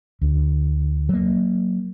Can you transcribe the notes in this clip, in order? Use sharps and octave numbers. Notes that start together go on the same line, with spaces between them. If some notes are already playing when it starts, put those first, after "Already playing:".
D2
F#3 A#3